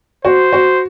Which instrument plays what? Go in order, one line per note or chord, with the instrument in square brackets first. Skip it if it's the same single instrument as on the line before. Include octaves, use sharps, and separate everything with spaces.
[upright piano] F#4 [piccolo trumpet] C5
[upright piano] F#4